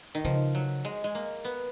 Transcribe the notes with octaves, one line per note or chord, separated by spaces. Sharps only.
D#3
C#3 F3
F#3
G#3
G#3
A#3
B3